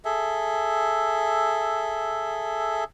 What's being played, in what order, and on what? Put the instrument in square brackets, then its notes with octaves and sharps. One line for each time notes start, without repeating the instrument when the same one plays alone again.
[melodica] G#4 A4 E5